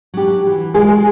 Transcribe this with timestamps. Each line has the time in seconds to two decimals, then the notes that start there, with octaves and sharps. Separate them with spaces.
0.14 F#3 D4 G4
0.47 E3
0.74 G#3 F4 G#4 A#4